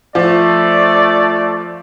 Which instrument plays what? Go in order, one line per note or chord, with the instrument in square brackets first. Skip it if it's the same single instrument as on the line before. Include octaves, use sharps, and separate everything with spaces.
[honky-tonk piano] F3 [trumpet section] A3 D5